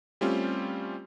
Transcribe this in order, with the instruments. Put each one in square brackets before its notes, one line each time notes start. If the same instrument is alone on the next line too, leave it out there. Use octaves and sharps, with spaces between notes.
[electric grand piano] G3 A3 C4 C#4 F4 G4